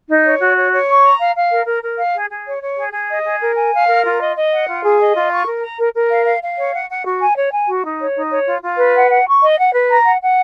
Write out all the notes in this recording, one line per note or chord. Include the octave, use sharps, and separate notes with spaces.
D#4
C#5
F#4
C#5
C#5
C#6
A#5
F5
F5
A#4
A#4
A#4
F5
G#4
G#4
C#5
C#5
G#4
G#4
D#5
G#4
A#4
G#5
F5
A#4
F4
D#5
D#5
F#5
F4
G#4
D#5
F4
C#6
A#4
A#5
A#4
A#4
F5
F5
F5
C#5
F#5
F#5
F#4
G#5
C#5
G#5
F#4
D#4
C#5
D#4
C#5
F4
F4
B4
F#5
F#5
C#6
D#5
F#5
B4
A#5
F#5
F#5